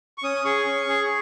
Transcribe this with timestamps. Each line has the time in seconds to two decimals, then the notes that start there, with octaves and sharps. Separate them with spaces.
0.18 C#6
0.23 C#4 D#6
0.45 G#4 C#6
0.66 C#4
0.89 G#4